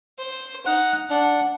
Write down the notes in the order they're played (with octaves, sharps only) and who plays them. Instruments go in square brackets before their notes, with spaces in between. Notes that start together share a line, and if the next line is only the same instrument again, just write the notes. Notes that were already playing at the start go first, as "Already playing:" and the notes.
[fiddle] C5
[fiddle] D#4 [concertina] F#5
[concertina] D4 [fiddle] F#5